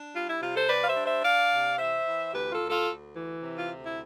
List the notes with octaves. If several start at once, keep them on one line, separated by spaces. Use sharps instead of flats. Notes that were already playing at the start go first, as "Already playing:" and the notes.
Already playing: D4
G3 F4
E4
C3 F4
A4 C5
G3 B4 D5
F5
C5 E5
D4
C5 E5
D4 D5 F5
C3
E3 C5 E5
E3
D2 G4 B4
F4 A4
D2
F4 A4
D2
E3
C3
F4
D2
E4